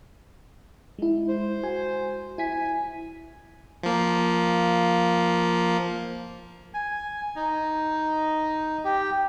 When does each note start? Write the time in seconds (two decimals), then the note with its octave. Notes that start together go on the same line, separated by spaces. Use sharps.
0.99 G#3 E4
1.28 C5
1.63 F#4 G#5
2.38 E4 G#5 B6
3.83 F3 A#3
6.74 G#5
7.36 D#4
8.84 G4